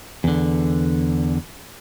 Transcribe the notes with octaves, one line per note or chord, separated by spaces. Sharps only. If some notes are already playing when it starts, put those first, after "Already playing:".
E2 D3